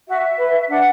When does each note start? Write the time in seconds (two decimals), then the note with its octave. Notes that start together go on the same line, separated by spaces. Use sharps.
0.07 F#4 E5
0.38 B4
0.69 D4 F#5